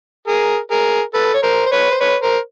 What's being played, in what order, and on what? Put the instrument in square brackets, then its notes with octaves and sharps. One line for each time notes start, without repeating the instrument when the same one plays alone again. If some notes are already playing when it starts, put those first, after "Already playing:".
[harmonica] G#4 A#4
G#4 A#4
A4 B4
C#5
A#4 C5
C5
B4 C#5
C5
B4 C#5
A#4 C5